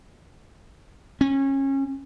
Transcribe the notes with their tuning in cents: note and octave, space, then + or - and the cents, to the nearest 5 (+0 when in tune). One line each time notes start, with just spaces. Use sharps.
C#4 -25